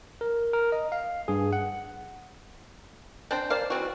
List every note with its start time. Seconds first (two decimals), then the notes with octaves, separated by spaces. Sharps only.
0.21 A#4
0.53 A#4
0.72 D#5
0.92 F5
1.28 G2 G#4
1.53 F#5
3.31 C4 D4 C5 G5
3.50 A#3 C5 D5 F5
3.70 E3 F#3 C4 F#4